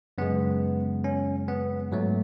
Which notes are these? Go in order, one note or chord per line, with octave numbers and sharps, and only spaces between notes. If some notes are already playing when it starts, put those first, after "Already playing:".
F#2 C#3 G#3 B3
C#4
B3
G#2 F#3 A3